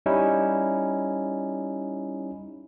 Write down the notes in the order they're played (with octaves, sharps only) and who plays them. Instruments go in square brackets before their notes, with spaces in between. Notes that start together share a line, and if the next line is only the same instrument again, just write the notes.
[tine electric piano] G3 C#4 D#4 E4